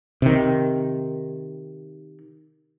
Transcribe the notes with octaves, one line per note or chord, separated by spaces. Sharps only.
C3 D#3